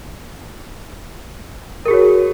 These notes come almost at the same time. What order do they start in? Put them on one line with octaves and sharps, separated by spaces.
A#4 G#4 F#4 C#5